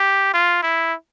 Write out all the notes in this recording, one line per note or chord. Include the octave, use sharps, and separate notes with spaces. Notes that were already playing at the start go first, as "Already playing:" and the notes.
Already playing: G4
F4
E4